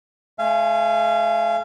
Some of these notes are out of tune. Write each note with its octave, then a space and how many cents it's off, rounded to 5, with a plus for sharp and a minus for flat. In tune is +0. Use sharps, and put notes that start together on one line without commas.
A3 -45 F5 -30 G#5 +0